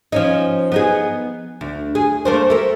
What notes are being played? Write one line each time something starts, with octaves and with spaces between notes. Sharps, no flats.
F3 C#4 D#4
B3 D#4 G#4
D2
G#4
A3 A#3 C5
A3 A#4